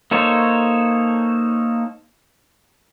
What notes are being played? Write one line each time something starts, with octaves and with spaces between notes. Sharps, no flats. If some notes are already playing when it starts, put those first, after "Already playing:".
A#3 D#4 A4 C5 C#5